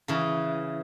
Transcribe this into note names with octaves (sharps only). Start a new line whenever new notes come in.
C#3 E3